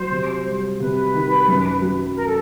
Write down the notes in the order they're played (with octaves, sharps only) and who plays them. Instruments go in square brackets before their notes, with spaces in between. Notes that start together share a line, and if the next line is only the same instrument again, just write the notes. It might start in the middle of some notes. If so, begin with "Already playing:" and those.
Already playing: [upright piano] F#3 [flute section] C5
[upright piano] C3
G3
[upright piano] C3 [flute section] B4
[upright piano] D#3
F#2
F#3
[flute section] A#4
A4